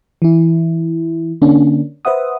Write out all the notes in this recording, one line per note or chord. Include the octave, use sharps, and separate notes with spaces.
E3 E4
D3 A#3 C#4 D4
B4 C5 E5 F#5 D#6